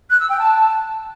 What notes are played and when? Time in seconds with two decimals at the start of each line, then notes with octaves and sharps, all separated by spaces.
0.09 F#6
0.19 E6
0.29 G5
0.39 A5